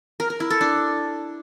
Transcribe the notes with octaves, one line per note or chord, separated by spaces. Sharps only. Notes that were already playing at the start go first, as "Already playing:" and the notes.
A#4
A#4
E4
A4
D4